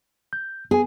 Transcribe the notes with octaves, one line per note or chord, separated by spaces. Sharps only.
G6
B3 G#4 G#5